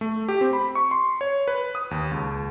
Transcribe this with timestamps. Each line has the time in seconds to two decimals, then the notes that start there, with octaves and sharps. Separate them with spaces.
0.01 A3
0.29 G4
0.41 C4
0.53 B5
0.75 C#6
0.91 C6
1.21 C#5
1.48 B4
1.75 D#6
1.91 D#2
2.11 C#2